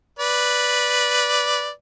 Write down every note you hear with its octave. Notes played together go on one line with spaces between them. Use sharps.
B4 D5